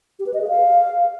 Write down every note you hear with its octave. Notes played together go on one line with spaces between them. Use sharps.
G4
B4
D#5
G#4
F5